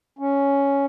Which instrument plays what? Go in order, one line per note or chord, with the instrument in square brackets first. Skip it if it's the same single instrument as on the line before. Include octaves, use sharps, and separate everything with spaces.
[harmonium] C#4